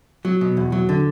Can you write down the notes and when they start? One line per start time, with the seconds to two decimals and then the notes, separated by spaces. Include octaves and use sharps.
0.25 F#3
0.41 B2
0.57 E2
0.72 F#3
0.89 D3